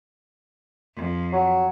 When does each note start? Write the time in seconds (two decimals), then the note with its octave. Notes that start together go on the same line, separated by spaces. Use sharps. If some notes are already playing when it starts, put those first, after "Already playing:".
0.95 F2
1.33 F#3